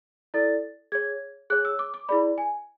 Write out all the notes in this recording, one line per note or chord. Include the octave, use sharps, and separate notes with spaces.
E4 A4 D5 A6
G#4 C#5 G#6
G#4 C#5 F#6
E6
D6
D6
E4 G#4 D5 B5
G#5